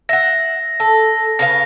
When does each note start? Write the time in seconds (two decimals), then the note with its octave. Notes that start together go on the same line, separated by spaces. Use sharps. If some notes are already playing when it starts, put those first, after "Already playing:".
0.09 E5 F#5 A#6
0.80 A4
1.39 C#3 B4 F5 A#6